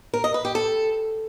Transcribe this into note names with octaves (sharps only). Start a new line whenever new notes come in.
A#4
D#5
B4
G4
A4